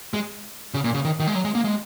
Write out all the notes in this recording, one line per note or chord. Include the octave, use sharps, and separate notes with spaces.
G#3
C#3
A#2
C#3
D#3
D#3
G#3
F#3
G#3
A#3
G#3